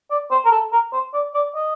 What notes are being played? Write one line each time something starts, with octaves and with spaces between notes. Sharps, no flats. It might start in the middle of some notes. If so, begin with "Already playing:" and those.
D5
C5
A#4
A4
A#4
C5
D5
D5
D#5